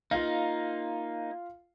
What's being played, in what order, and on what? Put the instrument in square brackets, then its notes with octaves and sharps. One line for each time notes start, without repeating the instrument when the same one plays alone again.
[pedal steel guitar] A#3 D#4 [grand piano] F4 F5